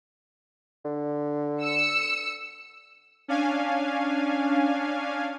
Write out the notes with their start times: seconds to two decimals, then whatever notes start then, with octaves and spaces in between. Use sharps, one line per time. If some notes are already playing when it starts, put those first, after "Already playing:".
0.85 D3
1.62 E6 C#7
3.28 C#4 D4 F5 G#5